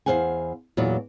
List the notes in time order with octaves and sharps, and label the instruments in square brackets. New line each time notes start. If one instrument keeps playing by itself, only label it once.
[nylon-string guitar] E2 F3 C5 F5 F#5 G#5
E2 A#2 F#3 B4 D5